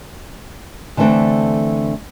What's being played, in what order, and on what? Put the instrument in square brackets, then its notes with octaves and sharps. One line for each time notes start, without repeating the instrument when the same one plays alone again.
[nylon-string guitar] D3 E3 G3 A3 C4 D4